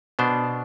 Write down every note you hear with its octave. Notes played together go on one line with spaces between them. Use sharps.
B2 B3 D4 C5